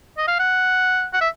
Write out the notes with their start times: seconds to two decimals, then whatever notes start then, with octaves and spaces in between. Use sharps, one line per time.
0.18 D#5
0.27 F5
0.39 F#5
1.13 F#5
1.21 E5